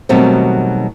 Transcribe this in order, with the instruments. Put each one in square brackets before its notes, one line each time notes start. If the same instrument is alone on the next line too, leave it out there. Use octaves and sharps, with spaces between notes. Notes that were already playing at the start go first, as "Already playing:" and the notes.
[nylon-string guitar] B2 D#3 F#3 G3 A3 C4